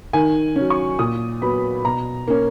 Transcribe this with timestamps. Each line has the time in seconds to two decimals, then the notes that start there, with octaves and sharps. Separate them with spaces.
0.13 D#3 G#5
0.56 F#3 C#4
0.70 C#6
0.99 A#2 D#6
1.42 F#3 B3 B5
1.85 B2 A#5
2.28 A#3 C#4